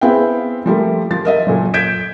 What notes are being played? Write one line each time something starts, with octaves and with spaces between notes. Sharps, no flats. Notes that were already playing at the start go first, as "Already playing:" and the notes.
B3 C4 E4 G#4 F5 G5
F3 G3 A3 A#3
F3 A6
A#4 D#5 E5
F#1 A#2 A4
G6 G#6 B6 D7 E7